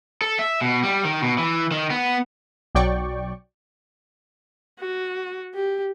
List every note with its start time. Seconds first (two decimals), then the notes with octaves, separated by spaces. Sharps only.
0.21 A4
0.39 E5
0.61 B2
0.83 G3
1.05 D#3
1.22 B2
1.38 E3
1.71 D#3
1.90 B3
2.75 B1 F#3 D5 G5 C#6
4.81 F#4
5.55 G4